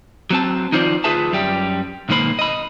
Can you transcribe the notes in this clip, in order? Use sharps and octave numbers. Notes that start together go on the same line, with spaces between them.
F#3 C4 A5
D#3 F3 D#4 F4 C5 D5
D2 F4 G#4 B4 E5 A5
F#2 G3 G4
B1 G#2 D#3 A#3 C5 B5
D#5 B5